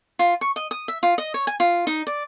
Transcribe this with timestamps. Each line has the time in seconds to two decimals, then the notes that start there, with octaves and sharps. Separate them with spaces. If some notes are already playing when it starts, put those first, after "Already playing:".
0.19 F4
0.41 C#6
0.56 D#5
0.71 D#6
0.88 E5
1.03 F4
1.18 D#5
1.34 C#5
1.47 G#5
1.60 F4
1.87 D#4
2.07 D5